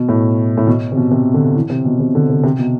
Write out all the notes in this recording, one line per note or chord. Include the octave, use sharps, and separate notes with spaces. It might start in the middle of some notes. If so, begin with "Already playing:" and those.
Already playing: B2
A2
A2
B2
C3
B2
C3
D3
E3
C3
B2
C3
D3
C3
C3
B2